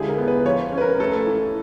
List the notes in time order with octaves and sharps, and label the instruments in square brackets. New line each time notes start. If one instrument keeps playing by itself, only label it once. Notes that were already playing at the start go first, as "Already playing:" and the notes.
Already playing: [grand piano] D3 G#3 [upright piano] E4 F4 G4 G#4
[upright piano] A#4
[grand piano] B3
[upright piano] B4
[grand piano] F3 [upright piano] C#5
[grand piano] C#4
[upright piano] B4
A#4
[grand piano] A3 [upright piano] A4
[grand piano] E3